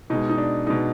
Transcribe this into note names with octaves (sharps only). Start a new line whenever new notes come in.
B2 G#3 D#4
D#4
D4
B2 G#3 D#4